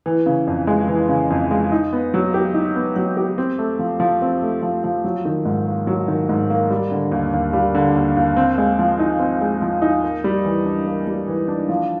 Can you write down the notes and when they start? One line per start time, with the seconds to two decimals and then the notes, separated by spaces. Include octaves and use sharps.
0.06 E3
0.26 C#3
0.47 F2
0.67 G#3
0.88 E3
1.09 C#3
1.30 F2
1.51 G#3
1.72 D#4
1.93 B3
2.14 F#3
2.34 G4
2.54 D#4
2.75 B3
2.96 F#3
3.17 G4
3.38 C4
3.58 A3
3.79 F3
4.00 F3
4.22 C4
4.42 A3
4.62 F3
4.84 F3
5.04 F#3
5.25 D#3
5.45 G#2
5.67 A#3
5.87 F#3
6.08 D#3
6.29 G#2
6.50 A#3
6.70 G3
6.91 D3
7.12 D#2
7.33 D#2
7.53 G3
7.75 D3
7.96 D#2
8.17 D#2
8.37 C4
8.58 G#3
8.79 F3
8.99 D#4
9.19 C4
9.41 G#3
9.62 F3
9.82 D#4
10.04 A#3
10.24 G3
10.45 E3
10.66 D4
10.86 A#3
11.07 G3
11.28 E3
11.48 D4
11.69 F3